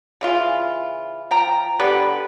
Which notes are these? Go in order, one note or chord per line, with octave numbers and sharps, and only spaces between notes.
C#3 E3 F4
F3 G5 A#5
D3 B3 G4 B4